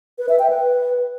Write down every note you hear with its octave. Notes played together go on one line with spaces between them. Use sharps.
B4
E5
G5
B4